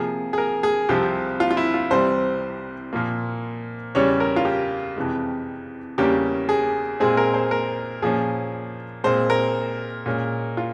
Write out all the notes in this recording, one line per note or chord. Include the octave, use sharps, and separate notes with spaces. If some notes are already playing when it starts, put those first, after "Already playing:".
Already playing: C3 F3 A#3 G#4
G#4
A#4
G#4
C2 C3 F3 C4 G4
F4
F4
E4
F4
C2 C3 E3 G3 C4 C5
A#2 F3 A#3
E2 C#3 G3 C#4 C#5
A#4
F4
G4
F2 C3 E3 G#3
E2 C#3 G3 A#3 C#4 G4
G#4
A#2 G#3 C4 G#4
A#4
C5
A#4
A#2 F3 A#3 C#4 G#4
A#2 G#3 C4 C5
A#4
A#2 G#3 C#4
F4